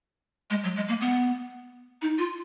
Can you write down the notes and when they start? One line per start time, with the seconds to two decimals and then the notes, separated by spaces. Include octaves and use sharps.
0.50 G#3
0.63 F#3
0.76 G#3
0.88 A#3
1.01 B3
2.02 D#4
2.18 F4